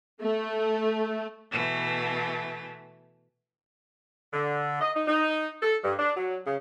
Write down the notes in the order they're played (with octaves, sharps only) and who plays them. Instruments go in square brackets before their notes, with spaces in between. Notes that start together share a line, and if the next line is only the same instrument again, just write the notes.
[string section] A3
[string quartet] B2 E3 A3
[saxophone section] D3
D#5
D#4
D#4
A4
G2
D4
F#3
C#3